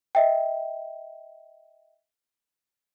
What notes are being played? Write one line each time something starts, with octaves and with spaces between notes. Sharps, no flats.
D#5 E5 G5